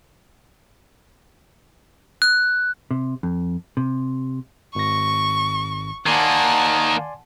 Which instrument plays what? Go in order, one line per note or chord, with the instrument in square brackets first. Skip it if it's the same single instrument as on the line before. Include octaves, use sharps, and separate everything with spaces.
[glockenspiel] F#6
[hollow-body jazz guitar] C3
F2
C3
[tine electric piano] G#1 A#6 [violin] C#6
[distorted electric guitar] D#3 A#3 [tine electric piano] D5 G#5 C6 [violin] F#5 A5